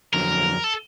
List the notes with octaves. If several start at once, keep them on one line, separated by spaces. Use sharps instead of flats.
F2 D3 F#3 A#4
A4